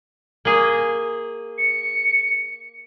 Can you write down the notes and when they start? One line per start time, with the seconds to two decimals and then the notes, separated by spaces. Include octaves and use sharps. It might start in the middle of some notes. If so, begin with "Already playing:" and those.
0.45 A#3 G#4
1.58 C#7